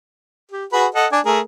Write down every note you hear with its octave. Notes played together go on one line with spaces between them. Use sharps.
G4
F#4 G#4 B4
A4 D#5 F#5
D4 D5 G#5
A3 G#4 A#4